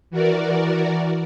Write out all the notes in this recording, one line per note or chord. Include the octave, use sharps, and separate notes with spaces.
E3 F#4 A#4 D5